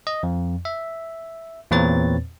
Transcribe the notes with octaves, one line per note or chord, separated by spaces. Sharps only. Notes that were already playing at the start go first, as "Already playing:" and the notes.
D#5
F2
E5
E2 A#2 C4 B4 C#5 A6